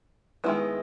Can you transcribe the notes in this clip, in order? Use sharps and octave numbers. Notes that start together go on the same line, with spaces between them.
D#3 G#3 B3 E4